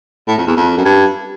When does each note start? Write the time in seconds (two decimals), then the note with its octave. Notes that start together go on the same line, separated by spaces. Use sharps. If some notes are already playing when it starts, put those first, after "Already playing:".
0.28 A2
0.38 F2
0.47 E2
0.57 F2
0.77 F#2
0.85 G2